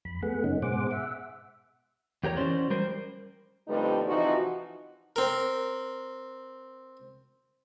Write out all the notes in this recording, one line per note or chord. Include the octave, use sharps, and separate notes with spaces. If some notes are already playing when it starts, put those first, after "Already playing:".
F2 B5
A3 B3 G#4 F#5
F#2 C#3 A#3 C#4 D#4
G#2 B2 G#4 C5 F#5 D6
E5 F#5
E2 G4 A#4 C#5
E3 G#3 C#4 F#4 C5 D5
G3 A#4 C5
F2 D3 G3 A3 B3 D#4
C3 E3 F3 D#4 F#4
C4 A#4